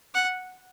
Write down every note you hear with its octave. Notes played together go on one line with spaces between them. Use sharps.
F#5